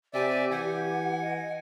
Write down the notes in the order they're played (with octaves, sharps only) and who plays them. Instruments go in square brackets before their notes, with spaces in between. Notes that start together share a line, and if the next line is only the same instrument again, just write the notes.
[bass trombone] C3 [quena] G4 [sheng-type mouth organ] D5 E5 [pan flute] G#5
[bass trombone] E3 [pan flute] F#5 [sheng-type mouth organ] G#5
[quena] D#5